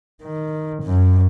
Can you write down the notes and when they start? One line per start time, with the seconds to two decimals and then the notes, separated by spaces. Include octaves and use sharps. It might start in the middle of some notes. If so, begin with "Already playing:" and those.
0.23 D#3
0.84 F#2